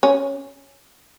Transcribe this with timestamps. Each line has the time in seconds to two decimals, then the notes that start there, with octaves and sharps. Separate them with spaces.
0.03 C#4